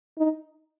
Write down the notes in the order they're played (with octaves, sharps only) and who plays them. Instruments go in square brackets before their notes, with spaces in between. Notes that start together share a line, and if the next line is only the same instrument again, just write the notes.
[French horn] D#4